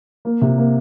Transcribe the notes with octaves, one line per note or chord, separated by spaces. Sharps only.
A#3
C3
A#3